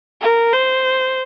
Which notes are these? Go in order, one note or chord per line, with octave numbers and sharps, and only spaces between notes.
A#4
C5